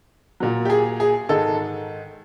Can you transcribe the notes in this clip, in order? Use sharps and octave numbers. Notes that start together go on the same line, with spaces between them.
A#2 F#3
G4
G#4
G#4
G#2 D#3 G#3 A4